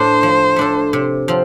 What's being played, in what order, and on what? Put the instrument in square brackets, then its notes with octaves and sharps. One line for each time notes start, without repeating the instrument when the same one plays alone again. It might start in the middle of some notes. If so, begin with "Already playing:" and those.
Already playing: [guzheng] A2 A3 D4 [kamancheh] C5
[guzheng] F3
A3 D4 A4
C3
F3 C4